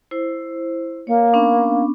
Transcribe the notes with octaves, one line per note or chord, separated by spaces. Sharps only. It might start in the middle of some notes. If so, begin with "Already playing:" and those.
E4 C5
A#3 C#5
B3 C#4 D4